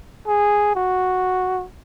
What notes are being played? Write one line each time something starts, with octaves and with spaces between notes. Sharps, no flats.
G#4
F#4